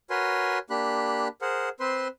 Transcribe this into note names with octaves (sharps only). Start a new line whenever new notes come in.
F#4 A#4 B4 C#5 G#5 C6
A#3 D4 G4 B5 F#6
G#4 A#4 C5 F#5
C4 B4 C5 C6